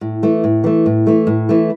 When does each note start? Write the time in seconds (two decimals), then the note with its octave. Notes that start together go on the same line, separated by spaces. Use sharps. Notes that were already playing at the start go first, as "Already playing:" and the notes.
0.01 A2
0.23 E3 A3
0.44 A2
0.64 E3 A3
0.86 A2
1.07 E3 A3
1.27 A2
1.49 E3 A3